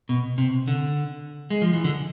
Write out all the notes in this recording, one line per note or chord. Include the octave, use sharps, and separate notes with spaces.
B2
C3
D3
G#3
F3
E3
D3